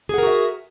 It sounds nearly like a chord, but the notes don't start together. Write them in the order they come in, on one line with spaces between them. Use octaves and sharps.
G#4 F#5 A#4 F#4 E5